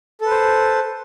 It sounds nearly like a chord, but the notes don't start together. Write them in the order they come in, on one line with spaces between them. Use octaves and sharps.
A4 B4 C5